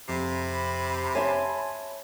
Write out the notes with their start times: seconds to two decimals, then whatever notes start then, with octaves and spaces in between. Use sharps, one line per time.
0.09 F2 C3 B5
1.15 C#5 E5 G#5 A5 C6